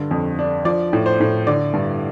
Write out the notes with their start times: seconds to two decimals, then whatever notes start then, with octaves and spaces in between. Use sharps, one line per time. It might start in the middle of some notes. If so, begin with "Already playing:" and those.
Already playing: G2 D3
0.11 F2
0.39 D4
0.65 F3 D5
0.93 A2
1.06 C5
1.20 A2
1.47 D3 D5
1.73 G2